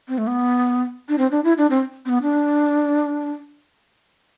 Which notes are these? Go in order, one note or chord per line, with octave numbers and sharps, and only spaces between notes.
C4
A3
B3
D4
C4
D4
E4
D4
C4
C4
B3
D4